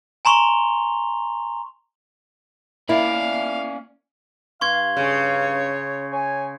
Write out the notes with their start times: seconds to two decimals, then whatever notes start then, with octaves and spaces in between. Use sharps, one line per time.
0.25 G#5 A#5 C6 C#6 F7 G7
2.89 A#3 C#4 E4 D5 F5
4.61 G2 F5 C6 C#6 G#6
4.97 C#3 C#5
6.12 C#5 G#5